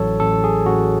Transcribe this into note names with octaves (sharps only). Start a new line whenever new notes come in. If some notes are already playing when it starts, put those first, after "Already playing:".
Already playing: A1 F#3 A4 C#5
A1 A4
G#4
A1 F#4